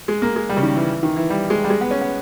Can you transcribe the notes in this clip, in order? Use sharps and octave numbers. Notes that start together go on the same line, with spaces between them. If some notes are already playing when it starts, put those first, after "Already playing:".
G#3
A#3
G#3
G3
C#3
D#3
E3
D#3
E3
G3
G#3
G3
G#3
B3
C#4
B3